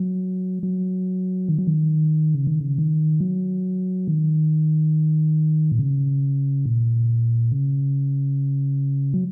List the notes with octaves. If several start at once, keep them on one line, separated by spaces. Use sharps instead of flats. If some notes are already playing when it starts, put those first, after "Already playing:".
Already playing: F#3
F#3
D#3
F#3
D#3
C#3
D#3
C#3
D#3
F#3
D#3
A#2
C#3
A#2
C#3
F#3